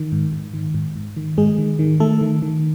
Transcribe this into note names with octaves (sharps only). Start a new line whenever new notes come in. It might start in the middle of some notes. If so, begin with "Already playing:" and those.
Already playing: D#3
G#2
G#2
D#3
G#2
G#2
D#3
G#2 G#3 G#4
D#3
D#3
D#3 A3 A4
D#3
D#3